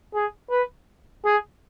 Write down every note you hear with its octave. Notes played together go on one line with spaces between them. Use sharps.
G#4
B4
G#4